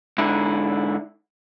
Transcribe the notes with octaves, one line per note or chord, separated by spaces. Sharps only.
G#2 D3 E4